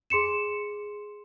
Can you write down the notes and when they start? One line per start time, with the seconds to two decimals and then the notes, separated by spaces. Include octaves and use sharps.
0.10 G#4 C6 C#7 E7